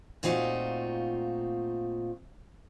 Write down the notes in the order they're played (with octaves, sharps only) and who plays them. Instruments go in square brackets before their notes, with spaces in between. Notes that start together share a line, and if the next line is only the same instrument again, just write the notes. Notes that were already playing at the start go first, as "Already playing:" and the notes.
[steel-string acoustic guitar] A#2 A3 C4 D#4 F4 F#4